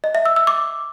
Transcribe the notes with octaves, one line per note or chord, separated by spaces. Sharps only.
D#5
E5
E6
E6
D6